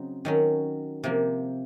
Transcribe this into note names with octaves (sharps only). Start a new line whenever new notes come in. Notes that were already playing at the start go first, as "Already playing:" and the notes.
Already playing: C#3 F#3 C4 D#4
D#3 F#3 C#4
C3 F3 A#3